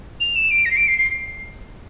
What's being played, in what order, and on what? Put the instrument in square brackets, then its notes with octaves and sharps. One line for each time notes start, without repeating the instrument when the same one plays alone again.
[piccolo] F7
E7
D7
A#6
C7
D7
C7
C7